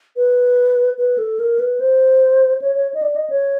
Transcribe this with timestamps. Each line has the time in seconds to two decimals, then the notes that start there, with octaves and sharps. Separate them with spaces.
0.16 B4
0.98 B4
1.18 A4
1.39 A#4
1.59 B4
1.80 C5
2.62 C#5
2.75 C#5
2.94 D#5
3.02 D5
3.16 D#5
3.30 C#5